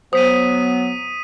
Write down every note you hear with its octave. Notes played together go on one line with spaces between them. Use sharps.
F#3 B3 C5 D#6 B6 D#7